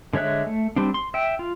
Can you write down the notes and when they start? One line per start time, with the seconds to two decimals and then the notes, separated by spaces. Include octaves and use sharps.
0.13 D3 G#3 C#5 E5 F#6
0.46 A3
0.76 G3 C4 D4
0.94 C6
1.14 E5 G5
1.39 F4